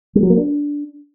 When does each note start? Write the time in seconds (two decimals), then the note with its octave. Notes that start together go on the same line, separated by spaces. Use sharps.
0.15 G3
0.23 F#3
0.30 A#3
0.37 D4